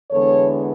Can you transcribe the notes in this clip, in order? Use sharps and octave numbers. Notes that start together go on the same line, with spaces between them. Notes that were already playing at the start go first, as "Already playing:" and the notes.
E2 D3 G#3 B3 A4 C#5